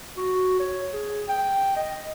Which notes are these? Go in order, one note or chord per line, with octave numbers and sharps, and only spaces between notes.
F#4
C#5
G#4
G5
D#5